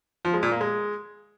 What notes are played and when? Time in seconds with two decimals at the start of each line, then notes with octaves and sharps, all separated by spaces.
0.25 F3
0.34 G#3
0.43 A#2
0.52 A#3
0.61 G#3